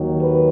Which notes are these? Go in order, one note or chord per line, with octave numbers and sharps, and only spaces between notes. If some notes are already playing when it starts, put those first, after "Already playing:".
Already playing: D#2 D#3 F#3
B4